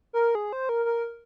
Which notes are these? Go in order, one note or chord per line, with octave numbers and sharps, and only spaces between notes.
A#4
G#4
C5
A#4
A#4